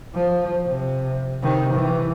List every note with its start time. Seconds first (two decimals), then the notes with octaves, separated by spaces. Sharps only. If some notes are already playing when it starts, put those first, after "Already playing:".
0.14 F3
0.67 C3
1.43 C3 D#3
1.73 E3